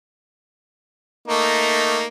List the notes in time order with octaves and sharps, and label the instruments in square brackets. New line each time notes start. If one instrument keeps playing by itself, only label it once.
[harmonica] A3 A#3 D#4